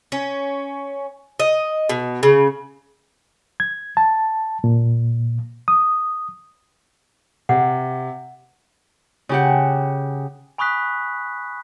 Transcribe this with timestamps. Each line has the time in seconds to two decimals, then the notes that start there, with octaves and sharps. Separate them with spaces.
0.12 C#4
1.40 D#5
1.90 B2
2.23 C#3
3.60 G#6
3.97 A5
4.64 A#2
5.68 D#6
7.49 C3 F#5
9.29 C#3 G4 F#5
10.58 G#5 B5 C#6 D#6 F#6 B6